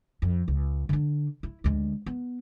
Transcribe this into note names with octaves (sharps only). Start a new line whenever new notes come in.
F2
C#2
D3 D4
E4
D2 G#3
B3